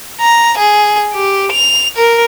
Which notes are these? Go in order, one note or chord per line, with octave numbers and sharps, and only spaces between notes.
A#5
G#4
G4
F7
A#4